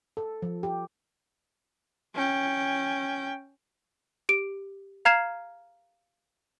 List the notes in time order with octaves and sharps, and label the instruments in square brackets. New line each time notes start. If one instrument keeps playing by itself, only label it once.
[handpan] A4
F3
G4
[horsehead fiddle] C#4 G5
[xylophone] G4 D7
F5 A#5 F6 G#6 C7 E7